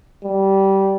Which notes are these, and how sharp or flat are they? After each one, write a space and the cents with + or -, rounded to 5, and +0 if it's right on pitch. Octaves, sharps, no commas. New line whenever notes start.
G3 -15